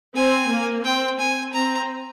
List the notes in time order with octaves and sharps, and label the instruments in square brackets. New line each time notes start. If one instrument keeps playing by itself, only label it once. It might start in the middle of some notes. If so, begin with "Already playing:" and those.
[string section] C4 [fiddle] G#5
[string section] A#3
[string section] C4 [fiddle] G5
[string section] C4 [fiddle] G#5
[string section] C4 [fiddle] A#5